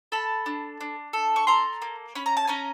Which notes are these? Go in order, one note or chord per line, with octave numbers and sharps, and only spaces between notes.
A4 A5 B5
D4
D4
A4
C#6
A4 A#5 C6
A#3
C#4 B5
A#5
A5
C#4 G#5 A#5